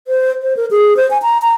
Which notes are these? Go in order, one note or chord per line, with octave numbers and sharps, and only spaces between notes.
C5
C5
A#4
G#4
C5
G#5
A#5
A#5